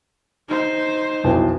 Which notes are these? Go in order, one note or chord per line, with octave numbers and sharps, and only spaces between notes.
D#4 C5
B1 F2 E3